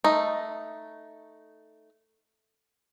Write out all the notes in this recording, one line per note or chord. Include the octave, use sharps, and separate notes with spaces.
A3 D#4